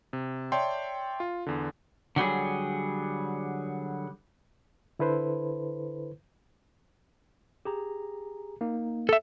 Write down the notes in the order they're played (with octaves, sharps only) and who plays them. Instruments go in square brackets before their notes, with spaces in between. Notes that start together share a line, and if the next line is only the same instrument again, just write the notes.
[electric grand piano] C3
C#5 D5 E5 G5 A5 C6
F4
E2 D3
[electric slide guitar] D3 F#3 G3 G#4
[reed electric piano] D3 E4 A4 B4 C5
[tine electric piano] G4 G#4 A#5
A#3 D#4
[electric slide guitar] A4 E5